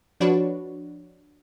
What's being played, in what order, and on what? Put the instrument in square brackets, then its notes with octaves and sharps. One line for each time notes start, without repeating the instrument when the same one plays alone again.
[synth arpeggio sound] F3 D4 F#4 B4 C#5